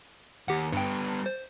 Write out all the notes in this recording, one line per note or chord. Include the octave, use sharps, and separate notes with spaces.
D#2 G4 F#5
G2 G3 B3 G5
C5